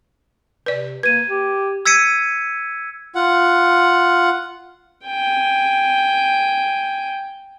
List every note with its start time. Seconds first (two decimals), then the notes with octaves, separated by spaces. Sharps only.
0.66 C3 B4 D5
1.03 A#3 B4 G#6 D#7
1.28 G4
1.86 E6 G#6 B6 C#7 D#7
3.15 F4 F#5
5.05 G5 G#5